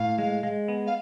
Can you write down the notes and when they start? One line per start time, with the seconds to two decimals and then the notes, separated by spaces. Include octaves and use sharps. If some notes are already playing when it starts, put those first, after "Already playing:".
Already playing: A2 F5
0.18 G#3
0.43 G#3
0.68 B3
0.87 F5